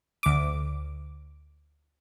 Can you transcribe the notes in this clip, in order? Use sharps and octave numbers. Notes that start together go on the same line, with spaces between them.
D2 D6